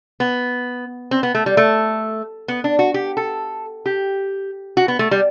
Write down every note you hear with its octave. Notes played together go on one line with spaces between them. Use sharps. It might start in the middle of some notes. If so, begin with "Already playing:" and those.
B3
C4
B3
A3
G3
A3
B3
D4
F#4
G4
A4
G4
F#4
B3
A3
G3